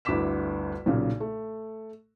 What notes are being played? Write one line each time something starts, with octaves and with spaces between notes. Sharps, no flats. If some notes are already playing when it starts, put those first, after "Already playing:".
G1 D2 E4 D6 B6 E7
B1 A#2 C#3
A3